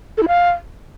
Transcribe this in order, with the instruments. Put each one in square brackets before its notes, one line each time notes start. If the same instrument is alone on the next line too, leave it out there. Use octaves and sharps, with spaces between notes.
[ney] A4
E4
F5